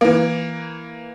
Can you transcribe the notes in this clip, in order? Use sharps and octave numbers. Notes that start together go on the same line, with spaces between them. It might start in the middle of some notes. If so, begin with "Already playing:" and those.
E3 A#3